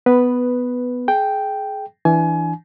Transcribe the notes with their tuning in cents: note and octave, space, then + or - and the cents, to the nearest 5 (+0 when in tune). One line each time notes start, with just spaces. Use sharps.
B3 +10 B4 +0
G#4 +30 G5 +0
E3 +0 D4 +0 G#5 +25